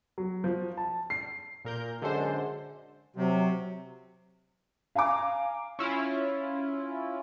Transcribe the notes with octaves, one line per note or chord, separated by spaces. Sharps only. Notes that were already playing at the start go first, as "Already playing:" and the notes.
F#3
F3
A5
C7
A#2 A#4 G6
F#2 D3 G#3 A4 C5
C3 F#3
F5 G#5 A#5 D6
C#4 E4 F4